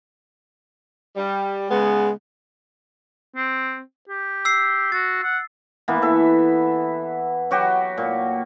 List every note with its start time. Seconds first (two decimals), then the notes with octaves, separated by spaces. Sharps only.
1.16 G3
1.70 C#3 G#3 B3
3.36 C4
4.09 G4
4.45 E6 C7
4.92 F#4 A6
5.23 F#5
5.88 E3 A#3 B3
6.02 A4 E5
7.51 F#3 F#4 G4
7.98 A#2